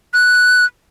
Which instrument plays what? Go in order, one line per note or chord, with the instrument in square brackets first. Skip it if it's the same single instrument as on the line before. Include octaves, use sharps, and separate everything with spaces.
[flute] F#6